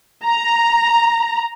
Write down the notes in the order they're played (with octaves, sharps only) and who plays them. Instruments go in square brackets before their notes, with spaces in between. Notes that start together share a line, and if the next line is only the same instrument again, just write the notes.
[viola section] A#5